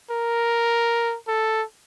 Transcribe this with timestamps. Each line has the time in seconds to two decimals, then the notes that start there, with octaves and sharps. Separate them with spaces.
0.10 A#4
1.28 A4